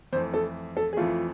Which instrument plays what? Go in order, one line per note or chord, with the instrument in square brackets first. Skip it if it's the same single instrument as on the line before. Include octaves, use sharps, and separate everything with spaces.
[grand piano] F2 [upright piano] C5
[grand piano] E3 A3
[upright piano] A4
A4
G#4
[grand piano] F2 E3 A3 [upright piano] F4